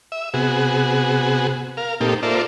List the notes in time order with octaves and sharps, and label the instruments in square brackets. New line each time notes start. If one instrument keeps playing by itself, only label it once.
[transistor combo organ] E5
C3 B3 F#4 G#4
A#4 F5
A#2 A#3 C4 D#4 G4 A4
F4 A4 A#4 C5 D5 E5